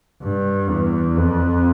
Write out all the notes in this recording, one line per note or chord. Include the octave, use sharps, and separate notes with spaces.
G2
E2
F2